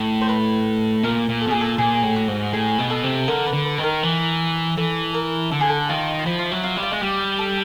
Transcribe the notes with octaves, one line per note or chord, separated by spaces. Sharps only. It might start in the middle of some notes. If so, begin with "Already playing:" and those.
Already playing: A2
C5
B4
A#2 A#4
A#2
A4
B2
A#2 G#4
A4
A#2 G#4
A2
F#4
G#2
A2 G#4
B2
A4
C3
D3 A#4
B4
D3
B4
D#3 B4
A#4
E3
E3 A4
A#4
D3 A4
G#4
A4
D#3 F4
F4
F3 E4
F4
E4
F#3
F4
G3
F4
G#3
G3 G4
A4